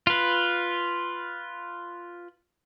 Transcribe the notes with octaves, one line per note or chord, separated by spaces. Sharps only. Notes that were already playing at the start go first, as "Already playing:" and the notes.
F4 B4